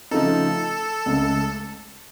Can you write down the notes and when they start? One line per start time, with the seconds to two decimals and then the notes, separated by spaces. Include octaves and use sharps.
0.11 C#3 F3 A3 D#4 A4
1.06 C#2 C#3 A3